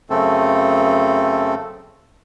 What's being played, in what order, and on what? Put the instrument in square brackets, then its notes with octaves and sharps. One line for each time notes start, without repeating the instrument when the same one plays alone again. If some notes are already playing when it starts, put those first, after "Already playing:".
[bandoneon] F#2 C#3 A3 C4 A4